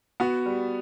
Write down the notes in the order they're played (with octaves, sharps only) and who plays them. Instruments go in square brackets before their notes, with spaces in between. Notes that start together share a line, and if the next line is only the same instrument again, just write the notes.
[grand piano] B3 [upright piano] F#4
[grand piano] G3